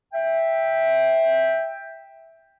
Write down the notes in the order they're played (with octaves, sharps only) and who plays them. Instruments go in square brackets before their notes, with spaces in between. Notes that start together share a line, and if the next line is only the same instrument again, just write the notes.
[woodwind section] E5 G5